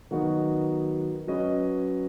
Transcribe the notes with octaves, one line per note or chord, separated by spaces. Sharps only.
D#3 F#3 B3 D#4 F#4
F#3 C#4 B4 D#5